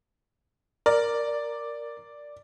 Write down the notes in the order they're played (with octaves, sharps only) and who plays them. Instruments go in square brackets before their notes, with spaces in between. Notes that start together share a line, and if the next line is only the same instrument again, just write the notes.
[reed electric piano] A#4 [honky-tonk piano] D5